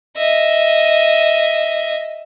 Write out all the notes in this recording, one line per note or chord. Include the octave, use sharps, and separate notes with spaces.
D#5 E5